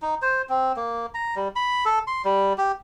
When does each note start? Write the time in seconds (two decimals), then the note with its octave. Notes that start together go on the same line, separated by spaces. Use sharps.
0.02 D#4
0.22 C5
0.49 C4
0.76 A#3
1.14 A#5
1.36 G3
1.56 B5
1.85 A4
2.07 C6
2.25 G3
2.58 G4